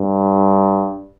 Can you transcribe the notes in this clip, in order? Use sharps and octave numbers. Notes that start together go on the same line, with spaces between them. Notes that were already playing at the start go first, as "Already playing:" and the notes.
Already playing: G2